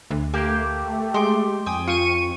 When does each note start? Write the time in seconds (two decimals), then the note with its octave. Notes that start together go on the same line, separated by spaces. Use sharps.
0.11 D2
0.34 A3 A#3 G4 C6
1.14 G#3 C6 D6
1.66 F2 G5 G#5 D#6
1.88 F4 C#6 D#7